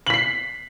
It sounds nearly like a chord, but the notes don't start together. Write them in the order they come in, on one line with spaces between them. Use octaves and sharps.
F#7 B6 C7